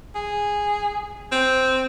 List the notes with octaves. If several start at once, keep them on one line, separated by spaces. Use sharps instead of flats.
G#4
C4